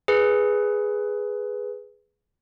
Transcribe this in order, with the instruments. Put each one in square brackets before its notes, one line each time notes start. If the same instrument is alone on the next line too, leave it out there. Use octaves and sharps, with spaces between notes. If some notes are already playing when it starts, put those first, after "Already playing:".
[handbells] G#4 B4